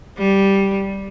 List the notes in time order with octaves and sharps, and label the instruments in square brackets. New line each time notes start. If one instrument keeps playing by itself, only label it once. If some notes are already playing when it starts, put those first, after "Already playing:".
[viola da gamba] G3